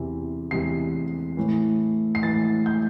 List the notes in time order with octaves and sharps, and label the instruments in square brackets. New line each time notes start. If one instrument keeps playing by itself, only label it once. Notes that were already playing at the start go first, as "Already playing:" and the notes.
Already playing: [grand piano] E2 C3 E3
E2 C3 E3 C7
A2 E3
C7
A2 E3 A6
G6